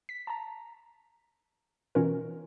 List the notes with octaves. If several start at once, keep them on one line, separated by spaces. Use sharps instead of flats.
B6
A5 A#5
B2 E3 C#4 D#4 F4 A#4